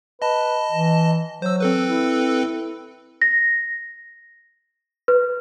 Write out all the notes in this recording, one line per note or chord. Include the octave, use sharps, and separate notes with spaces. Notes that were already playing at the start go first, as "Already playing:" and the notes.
B4 D#5 A5
E3
F#3 C5 E6
C4 A4 B4
E4
A#6
B4